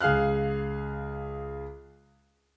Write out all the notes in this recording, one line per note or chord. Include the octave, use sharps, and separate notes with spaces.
C#2 G#4 F5 F6 F#6